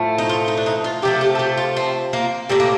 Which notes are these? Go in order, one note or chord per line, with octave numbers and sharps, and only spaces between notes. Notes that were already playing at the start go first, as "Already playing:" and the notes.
Already playing: A2 F3 A3
D#4
F4
D#4
D4
D#4
F4
C3 F3 A3 G4
G4
A4
G4
F4
C4
A#3
A2 G3 A#3
A#3